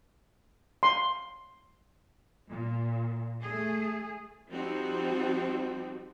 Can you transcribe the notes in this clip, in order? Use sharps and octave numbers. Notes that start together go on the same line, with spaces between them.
C6
A#2
A3 G#4
F3 G3 C4 D#4 F#4